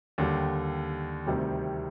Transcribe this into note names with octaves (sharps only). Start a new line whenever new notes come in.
D#2 D3 G3
D2 C3 D#3 G3